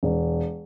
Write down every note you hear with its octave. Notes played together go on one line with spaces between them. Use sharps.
E1